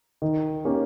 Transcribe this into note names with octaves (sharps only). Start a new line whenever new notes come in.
D#3
A#3 C#4 G4